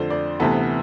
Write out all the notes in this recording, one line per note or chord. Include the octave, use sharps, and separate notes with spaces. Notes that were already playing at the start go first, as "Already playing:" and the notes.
Already playing: F2 D3 A3 D4 C5
D5
D2 C3 E3 B3 A4